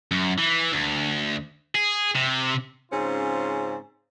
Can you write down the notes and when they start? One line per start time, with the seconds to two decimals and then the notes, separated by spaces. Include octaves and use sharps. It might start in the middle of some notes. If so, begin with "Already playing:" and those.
0.11 F#2
0.38 E3
0.73 D2
1.75 G#4
2.15 C3
2.92 G#2 C#3 C4 C#4 F4